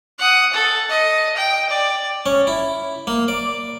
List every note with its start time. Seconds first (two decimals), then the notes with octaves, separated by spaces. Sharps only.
0.19 F#5 D#6
0.53 A4
0.89 D#5
1.36 G5
1.69 D5
2.26 C#4
2.47 E4
3.07 A#3
3.28 D5